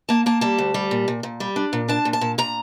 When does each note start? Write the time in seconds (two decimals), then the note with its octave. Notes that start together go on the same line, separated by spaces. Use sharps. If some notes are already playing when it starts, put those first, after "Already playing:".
0.09 A#3 A5
0.26 A#3 A5
0.41 G3 A5
0.58 D2
0.74 G3
0.91 A#2
1.08 A#2
1.23 A#2
1.40 G3
1.56 D4
1.73 A#2
1.88 D4 A5
2.05 A#2
2.13 A5
2.21 A#2
2.38 A#2 A#5